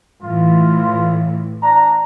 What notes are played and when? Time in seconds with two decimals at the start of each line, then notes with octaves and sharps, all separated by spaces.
0.23 A2 E3 F4
1.63 D4 A#5